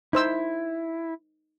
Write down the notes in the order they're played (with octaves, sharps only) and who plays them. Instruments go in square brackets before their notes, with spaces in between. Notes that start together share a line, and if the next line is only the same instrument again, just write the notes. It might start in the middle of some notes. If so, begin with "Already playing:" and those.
[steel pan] D#4 C5 E6 [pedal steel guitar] E4